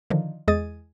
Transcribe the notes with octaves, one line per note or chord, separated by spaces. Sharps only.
D3 D#3 F3
E2 G#3 G#4 D#5 D#6 A6